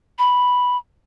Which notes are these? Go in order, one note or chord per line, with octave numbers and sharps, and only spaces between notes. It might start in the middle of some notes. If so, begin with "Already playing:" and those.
B5